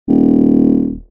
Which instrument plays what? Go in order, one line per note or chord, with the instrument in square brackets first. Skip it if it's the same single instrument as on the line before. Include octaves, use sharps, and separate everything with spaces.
[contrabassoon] D#1